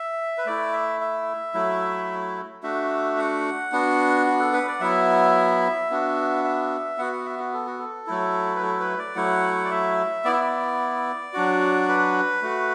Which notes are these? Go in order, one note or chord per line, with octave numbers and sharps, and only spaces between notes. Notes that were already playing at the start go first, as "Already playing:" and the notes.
Already playing: E5
B4
A3 E4 D5
E5
E5
F#3 A3 E4
A3 D4 F#4 E5
F#5
B3 D4 F#4
F#4
A4
B4
D5
F#3 B3 E4 E5
B3 D4 F#4
E5
B3 F#4 F#5
F#5
E5
F#4
A4
F#4
A4
F#3 A3 E4
B4
A4
B4
D5
F#3 A3 E4 F#5
D5
E5
B3 E4 D5
E5
D5
F#3 D4 F#4
B4
A3 F#4